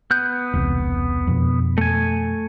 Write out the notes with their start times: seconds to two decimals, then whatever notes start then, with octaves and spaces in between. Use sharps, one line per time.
0.11 B3 F#6 G6
0.53 E1 C2
1.27 F2 B2
1.78 A3 G#5